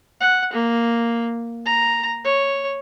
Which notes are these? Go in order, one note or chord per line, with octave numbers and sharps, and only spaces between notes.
F#5
A#3
A#5
C#5